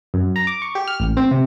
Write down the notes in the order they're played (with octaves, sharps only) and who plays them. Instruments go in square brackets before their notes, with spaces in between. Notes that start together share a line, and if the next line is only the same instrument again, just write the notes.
[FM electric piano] F#2
A#5
D6
C#6
G4
F6
A1
C4
C3